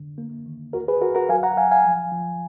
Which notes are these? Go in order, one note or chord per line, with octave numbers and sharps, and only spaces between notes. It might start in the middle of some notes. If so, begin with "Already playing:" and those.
Already playing: D3
A#3
D#3
D#2 F#4 A#4
G#4 B4
D#2 F#4 A#4
F#4 A#4
F#3 F5 G#5
F#5 A#5
F#3 F5 G#5
F5 G#5
F3
F3